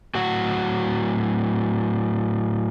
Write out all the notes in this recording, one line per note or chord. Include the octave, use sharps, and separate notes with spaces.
A2 F#3 F#4 F#5